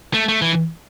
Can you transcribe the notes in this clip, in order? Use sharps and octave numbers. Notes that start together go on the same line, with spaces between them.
A3
A3
E3